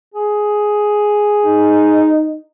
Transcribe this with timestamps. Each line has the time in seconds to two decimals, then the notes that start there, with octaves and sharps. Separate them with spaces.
0.14 G#4
1.46 D#4